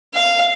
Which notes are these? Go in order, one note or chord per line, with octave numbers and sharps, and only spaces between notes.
F5